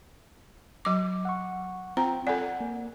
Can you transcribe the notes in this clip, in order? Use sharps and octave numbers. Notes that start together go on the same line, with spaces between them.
F#3 D6
F#5 C#6
C4 F4 G5 A#5
A4 D5 F#5 G#5
A#3